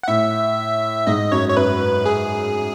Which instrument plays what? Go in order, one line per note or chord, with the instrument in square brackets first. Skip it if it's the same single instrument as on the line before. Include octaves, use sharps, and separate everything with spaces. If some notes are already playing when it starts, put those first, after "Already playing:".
[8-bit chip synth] F#5
[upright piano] A2 [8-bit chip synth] E5
[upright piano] G#2 [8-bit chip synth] D#5
[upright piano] F#2 [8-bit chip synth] C#5
[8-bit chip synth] C#5
[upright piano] F#2 [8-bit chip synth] B4
[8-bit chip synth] G#4